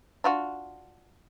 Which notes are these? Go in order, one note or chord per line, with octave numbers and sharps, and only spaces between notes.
D4 F4 F#4